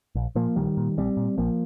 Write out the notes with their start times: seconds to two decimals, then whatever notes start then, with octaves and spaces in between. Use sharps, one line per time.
0.15 A#1
0.35 A#2 F3 A#3
0.56 A#1 D#3 G3
0.77 A#2
0.97 A#1 G3 C4
1.17 A#2
1.38 A#1 F3 A#3